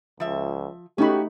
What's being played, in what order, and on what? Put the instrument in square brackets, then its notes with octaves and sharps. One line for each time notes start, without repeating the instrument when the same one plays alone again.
[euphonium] C#2 [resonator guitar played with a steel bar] F3 E5
[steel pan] A3 D#4 B5 [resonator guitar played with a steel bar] C#4 F#4 [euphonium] G4